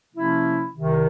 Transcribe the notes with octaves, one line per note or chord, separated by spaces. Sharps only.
C3 F3 A#3 C#4 E4
C2 C3 D#3